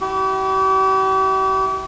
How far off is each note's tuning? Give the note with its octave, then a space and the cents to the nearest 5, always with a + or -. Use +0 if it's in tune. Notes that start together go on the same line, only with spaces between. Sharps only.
E4 -10 G4 -40